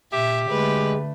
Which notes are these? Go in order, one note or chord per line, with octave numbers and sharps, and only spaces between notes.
A#2 G4 E5
D3 G#3 A3 B4